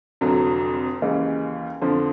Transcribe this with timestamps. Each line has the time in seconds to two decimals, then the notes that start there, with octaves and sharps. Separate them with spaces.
0.21 F1 F2 D3 F#3
1.01 D#2 C#3 E3 G#3
1.81 F2 D3 F3